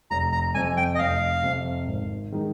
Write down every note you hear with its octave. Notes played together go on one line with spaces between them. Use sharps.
F1 A#5
A#5
F2 C3 G#5
G5
D#5
F1 F5
F2 C3
G#1
D#3 G#3 D#4